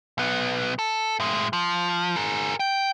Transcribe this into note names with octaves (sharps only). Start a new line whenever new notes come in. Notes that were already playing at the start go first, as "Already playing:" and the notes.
B1 B3
A4
A2 G#3
F3
G#4 A#4
G5